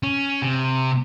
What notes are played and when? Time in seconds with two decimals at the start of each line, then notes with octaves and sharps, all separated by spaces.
0.03 C#4
0.42 C3